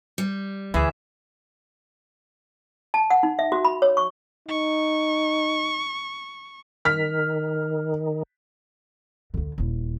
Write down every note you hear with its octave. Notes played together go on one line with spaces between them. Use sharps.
G3
D2 E3 G#4 E5
A5
F#5
D#4
E5
F#4
B5
C#5
C#6
D#4 C#6
D#3 F6 B6
D2 D3
D#1 E4